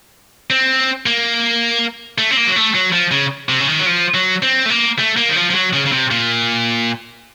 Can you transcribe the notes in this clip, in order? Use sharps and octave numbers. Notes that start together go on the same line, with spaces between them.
C4
A#3
A3
C4
A#3
F#3
A3
F#3
F3
C#3
C3
C#3
D#3
F#3
F3
F#3
C4
A3
A#3
A3
A#3
D#3
F3
F3
F#3
C#3
C#3
C3
A#2